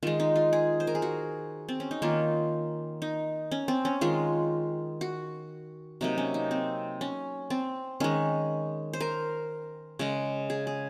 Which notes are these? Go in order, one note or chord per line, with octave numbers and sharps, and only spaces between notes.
D#3 G#3 F4
D#4
F4
G#4
C5
A#4
G#4
F#4
C4
C#4
D#4
D#3 A#3 F4
D#4
C#4
C4
C#4
D#3 G#3 F4
F#4
C3 F#3 A#3 D#4
C#4
D#4
C4
C#4
C4
D#3 G#3 C#4
C5
A#4
C#3 G#3
G#4
G#4